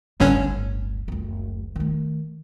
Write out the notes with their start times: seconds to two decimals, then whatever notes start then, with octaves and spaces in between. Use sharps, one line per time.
0.20 D1 G1 G2 D3 C#4
1.08 F#1 D2
1.76 D#3 A3